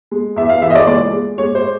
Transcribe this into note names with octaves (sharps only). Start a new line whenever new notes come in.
G#3
E2 E5
F5
E3 E5
D#5
D5
C#2 D5
G#3
G#3 C#5
C5